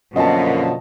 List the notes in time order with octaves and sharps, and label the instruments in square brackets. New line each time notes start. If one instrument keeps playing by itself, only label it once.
[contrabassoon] F#2 [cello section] B2 [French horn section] D3 F3 A#3 [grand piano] D#5 A5